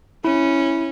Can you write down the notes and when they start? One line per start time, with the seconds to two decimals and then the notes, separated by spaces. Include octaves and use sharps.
0.24 C#4 E4